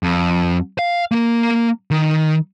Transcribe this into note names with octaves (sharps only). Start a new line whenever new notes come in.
F2
F5
A#3 A#4
D#3